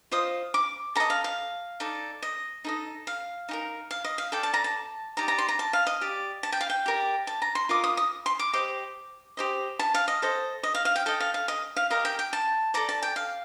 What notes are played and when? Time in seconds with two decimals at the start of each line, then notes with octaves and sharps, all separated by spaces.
0.11 F4 C5 D#5 D#6
0.54 D6
0.95 A4 D#5 A#5
1.10 F5
1.24 F5
1.80 D#4 A4 D5
2.22 D#5
2.64 D#4 A4 D#5
3.07 F5
3.49 D#4 G4 A#4
3.91 F5
4.04 D#5
4.18 F5
4.32 A4 D5 G5
4.43 A5
4.54 A#5
4.64 A5
5.17 D#4 G4 D5 A#5
5.28 A#5
5.38 C6
5.48 A#5
5.59 A5
5.73 F5
5.87 D#5
6.01 G4 D5
6.43 A5
6.52 G5
6.61 F5
6.70 G5
6.86 G4 A#4 D5
7.27 A5
7.42 A#5
7.55 C6
7.69 F4 A#4 D#5 D6
7.84 D#6
7.97 D#6
8.26 C6
8.39 D6
8.53 G4 C5 D#5 D6
9.37 G4 C5 D#5
9.79 A5
9.94 F5
10.08 D#5
10.22 A4 C5 D#5
10.63 D#5
10.75 F5
10.85 F5
10.96 G5
11.06 A4 D#5 G5
11.20 F5
11.34 F5
11.48 D#5
11.76 F5
11.90 G4 A#4 D#5 F5
12.05 G5
12.19 G5
12.33 A5
12.74 A4 D5 A#5
12.89 A5
13.03 G5
13.16 F5